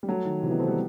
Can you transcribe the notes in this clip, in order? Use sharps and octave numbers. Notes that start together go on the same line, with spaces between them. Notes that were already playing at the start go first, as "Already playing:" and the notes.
G3
F#3 A3
D#3
C3 E3
B3 D#4
A3 C4
G3 B3